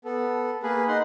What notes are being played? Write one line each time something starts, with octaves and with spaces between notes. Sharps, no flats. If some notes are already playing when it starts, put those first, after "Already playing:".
B3 A4
A#3 G#4 B4
D#4 F#5 C6